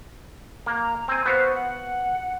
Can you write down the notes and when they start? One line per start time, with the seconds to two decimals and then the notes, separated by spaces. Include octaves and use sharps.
0.66 A#3 A#5
1.08 C4 G#5
1.26 B3 F#4 C5 F5
1.54 F#5